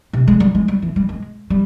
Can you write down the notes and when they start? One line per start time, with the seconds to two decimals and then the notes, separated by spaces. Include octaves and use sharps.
0.13 C3
0.28 G#3
0.40 G3
0.55 G#3
0.68 G3
0.82 E3
0.96 G3
1.09 G#3
1.50 G3